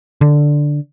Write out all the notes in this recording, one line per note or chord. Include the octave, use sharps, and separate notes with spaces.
D3